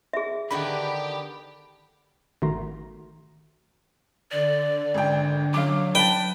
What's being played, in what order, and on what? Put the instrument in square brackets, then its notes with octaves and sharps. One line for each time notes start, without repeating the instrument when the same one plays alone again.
[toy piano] G#4 E5
[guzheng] D3 D#3 B3 [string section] G4 [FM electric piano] B5
[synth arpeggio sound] G#1 D#3 A3 F#4 A#5 C6
[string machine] D3 [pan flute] D5
[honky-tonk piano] G#1 G5
[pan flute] F#3 [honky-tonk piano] F5 D6
[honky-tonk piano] B4 A5 [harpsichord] G5